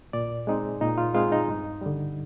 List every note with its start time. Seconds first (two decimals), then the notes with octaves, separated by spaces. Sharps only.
0.13 A#2 D5
0.47 G#3 C4 D#4
0.81 A#2 D#4
0.98 F4
1.15 G#3 C4 D#4 F4
1.32 D#4
1.48 G2
1.81 D3 G3